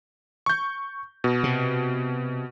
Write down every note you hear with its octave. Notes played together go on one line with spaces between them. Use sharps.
C#6 G6
B2
C3